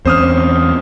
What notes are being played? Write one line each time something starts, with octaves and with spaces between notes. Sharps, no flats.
E2 C4 C#4 C5 D#6 F6